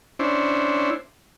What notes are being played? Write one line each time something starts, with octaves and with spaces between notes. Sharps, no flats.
C#4 D4 E4 C5